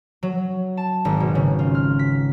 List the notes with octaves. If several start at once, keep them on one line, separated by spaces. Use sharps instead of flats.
F#3
A5
G#1
B2
C#3
F4
F6
B6